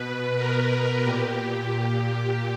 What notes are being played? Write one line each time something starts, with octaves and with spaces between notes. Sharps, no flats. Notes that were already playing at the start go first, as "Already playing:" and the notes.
Already playing: B2 B4
A#4
A#2 G4